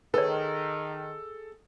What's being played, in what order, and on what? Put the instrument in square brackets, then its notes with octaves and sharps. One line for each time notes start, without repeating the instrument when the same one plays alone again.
[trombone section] D#3 [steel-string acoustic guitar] G#4 [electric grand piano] A4 [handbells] B4 C#5